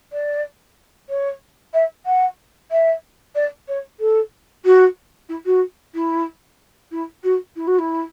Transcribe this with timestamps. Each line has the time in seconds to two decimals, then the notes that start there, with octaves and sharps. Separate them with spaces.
0.12 D5
1.09 C#5
1.73 E5
2.06 F#5
2.71 E5
3.35 D5
3.68 C#5
4.00 A4
4.65 F#4
5.29 E4
5.45 F#4
5.94 E4
6.91 E4
7.23 F#4
7.56 E4
7.67 F#4
7.78 E4